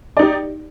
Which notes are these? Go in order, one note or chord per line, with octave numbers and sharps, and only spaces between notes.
D#4 G4 D5